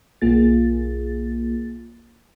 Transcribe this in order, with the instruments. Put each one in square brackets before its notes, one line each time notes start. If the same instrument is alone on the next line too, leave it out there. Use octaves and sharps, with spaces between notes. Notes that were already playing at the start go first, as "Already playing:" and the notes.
[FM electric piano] B1 A#3 F4 G#4 A6